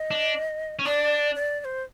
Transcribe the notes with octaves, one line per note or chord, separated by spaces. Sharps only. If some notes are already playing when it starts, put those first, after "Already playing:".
Already playing: D#5
D4
C#4
D4 D5
D5
D5
C5